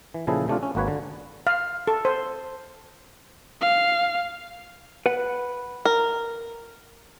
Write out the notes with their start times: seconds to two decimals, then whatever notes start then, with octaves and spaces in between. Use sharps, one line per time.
0.14 E3
0.27 A#2 C#3 F3 E4 G#4 A4
0.48 C3 A3 D4 F4
0.63 C#4
0.75 G#1 A#3 F#4 B4 C#5
0.88 D3
1.47 F5
1.87 A4
2.05 C5
3.61 F5
5.06 B4 F#5
5.85 A#4